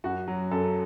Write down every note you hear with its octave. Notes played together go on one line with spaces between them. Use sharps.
F#2 F#4
F#3
F#2 A4